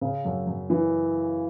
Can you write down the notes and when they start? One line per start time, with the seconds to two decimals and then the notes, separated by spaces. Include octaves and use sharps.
0.01 C#3
0.25 F#2
0.47 F#2
0.70 E3